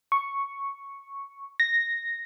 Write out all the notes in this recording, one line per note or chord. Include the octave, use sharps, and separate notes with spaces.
C#6
A#6